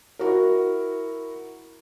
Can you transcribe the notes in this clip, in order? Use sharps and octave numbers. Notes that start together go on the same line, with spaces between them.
E4 F#4 A#4